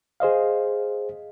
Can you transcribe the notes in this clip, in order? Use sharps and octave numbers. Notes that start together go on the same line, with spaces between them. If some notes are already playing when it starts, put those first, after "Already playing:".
G#4 C5 D#5 F5